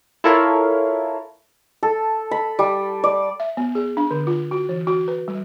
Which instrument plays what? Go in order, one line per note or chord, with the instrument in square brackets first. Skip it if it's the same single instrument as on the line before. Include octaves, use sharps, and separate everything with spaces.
[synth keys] E4 F4 A4 A#4 C#5 F5
[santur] A4
B5
G3
D5
[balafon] E5
B3
G#4
D4
D3
F4
F#4
E3
F#4
B4
G3